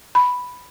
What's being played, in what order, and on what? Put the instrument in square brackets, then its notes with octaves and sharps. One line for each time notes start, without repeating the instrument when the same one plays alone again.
[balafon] B5